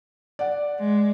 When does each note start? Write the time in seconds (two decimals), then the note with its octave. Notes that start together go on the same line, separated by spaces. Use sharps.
0.39 D5 F#5
0.79 G#3